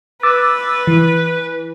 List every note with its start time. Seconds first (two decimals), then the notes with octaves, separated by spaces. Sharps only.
0.23 B4 D6 E6 A6
0.87 E3